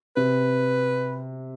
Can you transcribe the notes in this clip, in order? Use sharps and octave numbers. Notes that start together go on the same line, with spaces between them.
C3 B4